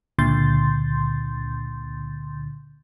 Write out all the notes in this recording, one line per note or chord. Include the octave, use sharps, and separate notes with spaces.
C#2 A#2 D3 C6 G6 A6